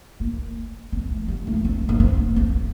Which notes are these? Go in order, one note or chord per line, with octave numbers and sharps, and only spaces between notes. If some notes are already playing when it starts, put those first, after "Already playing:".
A#3
C4
A3
G3
A3
A#3
C4
A#3
C4
C4